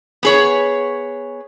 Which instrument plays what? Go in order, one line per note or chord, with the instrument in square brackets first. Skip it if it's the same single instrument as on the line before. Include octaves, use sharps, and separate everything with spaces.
[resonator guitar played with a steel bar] B3 G#4 C#5